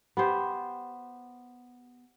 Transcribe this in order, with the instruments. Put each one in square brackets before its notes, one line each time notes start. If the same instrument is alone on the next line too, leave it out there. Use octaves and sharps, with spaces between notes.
[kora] B3 G4 C5